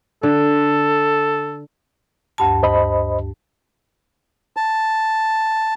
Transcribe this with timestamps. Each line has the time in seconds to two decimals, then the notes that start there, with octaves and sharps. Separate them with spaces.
0.23 D3 A4
2.38 D2 G2 A5
2.63 C5 D#5 B5
4.57 A5